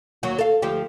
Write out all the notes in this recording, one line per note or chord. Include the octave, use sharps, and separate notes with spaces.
D#2 F#3 F#4
A4 F5
D2 F3 G4